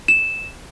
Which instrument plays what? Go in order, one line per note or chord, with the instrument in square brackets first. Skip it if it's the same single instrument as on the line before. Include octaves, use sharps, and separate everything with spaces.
[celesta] E7